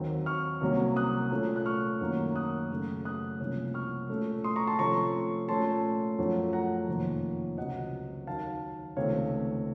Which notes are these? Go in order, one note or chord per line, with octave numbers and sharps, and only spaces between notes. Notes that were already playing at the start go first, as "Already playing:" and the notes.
Already playing: D#2 D#3 F#3 C4
C#6 F6
C2 C3 F#3 A#3 C#4
D#6 F#6
A#2 A3 C#4
F#6
C#6 F6
F#2 D#3 F#3 A#3 C#4
D#6 F#6
F#2 C#3 A3
D#6 F#6
C2 C3 F3 A#3 C#4
C#6 F6
A#2 A3 C#4
C6 D#6
A#5 C#6
A5 C6
C3 F3 A3 C#4 A#5 C#6
A#2 A3 C#4 A5 C6
F#2 F3 A3 C#4
F#5 A#5
F2 C3 D#3 A#3 C#4
C#2 C3 F#3 C4 D#5 F#5
D#2 D#3 F#3 F5 A5
C#2 C3 D#3 A3 C4 C#5 F5